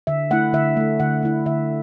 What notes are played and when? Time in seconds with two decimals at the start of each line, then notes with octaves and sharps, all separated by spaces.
0.07 D3 E5
0.31 A3 E4 F#5
0.53 D3 E5
0.77 A3 E4
1.00 D3 F#5
1.23 A3 E4
1.46 D3 E5